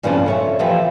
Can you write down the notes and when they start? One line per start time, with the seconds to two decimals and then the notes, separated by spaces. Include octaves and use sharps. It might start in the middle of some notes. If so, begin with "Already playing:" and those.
0.03 G2 C#3 E3 F3 B3 C4
0.26 A4 C#5 E5
0.59 E3 F3 G4 E5